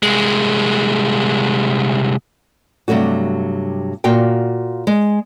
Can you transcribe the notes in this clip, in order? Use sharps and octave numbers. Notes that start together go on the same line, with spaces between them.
C2 G#3
G2 C3 F#3 A3 F#4
A#2 F#4 F5 G5
G#3